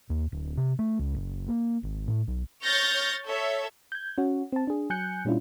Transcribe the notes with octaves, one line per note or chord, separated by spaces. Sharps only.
D#2
D1
C3
A3
C#2
F#1
A#3
G#1
A2
B1
C#5 C#6 F6 G6 A6 A#6
A4 C#5 E5
G6 G#6
C#4 F#4
C4 A5
D4 G#4
F#3 G#5 F#6 G6 C#7
A#2 G3 C#4 D4 E4 F4